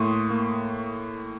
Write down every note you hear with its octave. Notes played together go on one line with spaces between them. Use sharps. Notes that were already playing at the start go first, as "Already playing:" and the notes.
Already playing: A2 A#3 C6 C#6 D#6
A#3